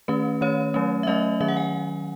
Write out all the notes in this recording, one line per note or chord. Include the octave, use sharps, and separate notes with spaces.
D#3 A3 C#4 B4
D#3 A3 C#4 C#5
F#3 A3 C#4
E5
F#3 A3 C#4 D#5
D#3 F#3 C#4 E5
F#5
G#5